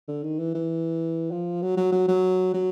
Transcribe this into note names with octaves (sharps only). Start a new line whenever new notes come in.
D3
D#3
E3
E3
F3
F#3
F#3
F#3
F#3
F#3